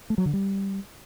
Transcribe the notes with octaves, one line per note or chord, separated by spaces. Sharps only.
A3
F#3
D3
G3